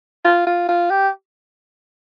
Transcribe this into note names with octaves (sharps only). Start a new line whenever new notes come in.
F4
F4
F4
G4